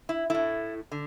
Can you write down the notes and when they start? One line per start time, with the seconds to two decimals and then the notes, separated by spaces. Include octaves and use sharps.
0.09 E4
0.30 A2 A3 E4
0.92 D3